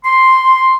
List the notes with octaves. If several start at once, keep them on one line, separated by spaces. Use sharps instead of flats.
C6